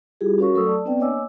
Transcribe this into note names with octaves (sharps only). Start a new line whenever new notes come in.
G3 E4 F4 G4 G#4
C#4 F#4 A#4 C#5 F5 C#6
F#3 A3 A4 C#6 D#6 E6
D5 A5
B3 C4 D4 B4 D5 G5
A#3 C#5 D#5 G#5 D6 E6